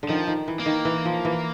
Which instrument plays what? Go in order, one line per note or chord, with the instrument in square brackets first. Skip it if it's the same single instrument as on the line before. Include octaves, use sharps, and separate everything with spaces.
[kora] D3
[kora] D#3 [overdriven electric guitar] F3
[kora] D#3
E3
[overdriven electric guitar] A#3
[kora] D#3
E3
F3
E3